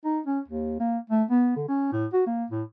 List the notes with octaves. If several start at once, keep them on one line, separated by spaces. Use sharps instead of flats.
D#4
C#4
D#2
A#3
A3
B3
D3
C#4
A2
F#4
A#3
A2